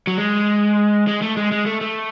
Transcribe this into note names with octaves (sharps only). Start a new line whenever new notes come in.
F#3
G#3
G#3
A3
G#3
G#3
A3
A3